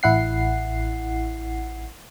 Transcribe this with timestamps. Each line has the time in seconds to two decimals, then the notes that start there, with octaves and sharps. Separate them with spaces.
0.03 A1 E4 F#5 C7